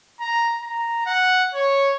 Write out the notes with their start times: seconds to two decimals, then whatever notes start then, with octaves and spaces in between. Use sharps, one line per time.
0.21 A#5
0.62 A#5
1.06 F#5
1.54 C#5